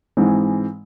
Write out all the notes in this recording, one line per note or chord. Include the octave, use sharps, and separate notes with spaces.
G#2 E3 G#3 C4